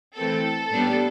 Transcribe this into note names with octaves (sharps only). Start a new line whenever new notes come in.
E3 A3 C4 A4
A2 G3 B3 D4